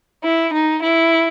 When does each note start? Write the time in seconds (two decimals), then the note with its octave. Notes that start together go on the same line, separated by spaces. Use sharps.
0.23 E4
0.53 D#4
0.82 E4